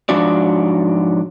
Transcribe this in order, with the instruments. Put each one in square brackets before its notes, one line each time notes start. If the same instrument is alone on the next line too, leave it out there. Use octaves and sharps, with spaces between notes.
[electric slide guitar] G#2 F3 F#3 D4 F#4 D5